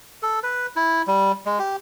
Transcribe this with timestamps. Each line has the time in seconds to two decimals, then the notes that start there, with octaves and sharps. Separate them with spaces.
0.22 A4
0.43 B4
0.76 E4
1.07 G3
1.46 G#3
1.59 G4